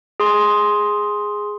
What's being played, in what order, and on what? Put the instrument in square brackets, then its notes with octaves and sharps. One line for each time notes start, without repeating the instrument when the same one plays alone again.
[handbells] G#4 C6